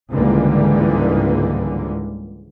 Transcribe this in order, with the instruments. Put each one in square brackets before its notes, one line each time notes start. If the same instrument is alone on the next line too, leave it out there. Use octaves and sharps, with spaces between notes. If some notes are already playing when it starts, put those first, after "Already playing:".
[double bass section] C#2 G#2 D3 E3 G3 A#3